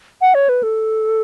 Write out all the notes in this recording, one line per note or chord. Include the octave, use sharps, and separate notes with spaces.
F#5
C#5
B4
A4